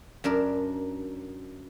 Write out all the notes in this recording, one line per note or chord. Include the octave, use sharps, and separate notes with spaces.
F#2 D4 A#4